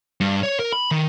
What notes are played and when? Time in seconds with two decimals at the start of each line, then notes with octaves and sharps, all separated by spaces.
0.20 G2
0.43 C#5
0.60 A#4
0.72 B5
0.91 D#3